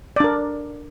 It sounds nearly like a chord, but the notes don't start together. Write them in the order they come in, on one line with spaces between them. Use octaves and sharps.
D5 D4 A#4